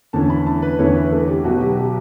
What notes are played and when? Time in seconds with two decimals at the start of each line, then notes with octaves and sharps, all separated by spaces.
0.13 E2 D3 A3 C#4 E4 A5
0.30 B5
0.46 A5
0.62 B4
0.79 E2 D3 A3 C#4 E4 C#5
0.95 B4
1.12 A4
1.28 G4
1.44 B1 B2 F#3 F#4
1.61 G4
1.77 G4